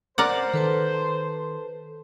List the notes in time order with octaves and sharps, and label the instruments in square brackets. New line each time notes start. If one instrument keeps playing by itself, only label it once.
[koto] A#4 D5 F#5 [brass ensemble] C5
[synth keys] D#3 [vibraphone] A4 B4 A5